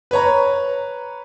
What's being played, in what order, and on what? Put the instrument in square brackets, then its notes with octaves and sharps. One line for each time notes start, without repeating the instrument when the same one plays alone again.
[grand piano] B4 C#5 A#5